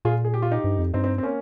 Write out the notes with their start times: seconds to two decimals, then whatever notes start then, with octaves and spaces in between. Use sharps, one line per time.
0.05 A#2 F4 G#4
0.25 G#4
0.34 G4
0.42 F4
0.52 D#4 G4
0.64 G2
0.78 F2
0.94 G2 C4 D#4
1.04 C4 D#4
1.18 C4
1.23 A#3 C#4